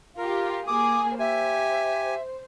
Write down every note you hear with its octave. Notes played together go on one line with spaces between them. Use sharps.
F4 G4 A#4
A#3 G#4 D6 D#6
G4 C5 E5 G#5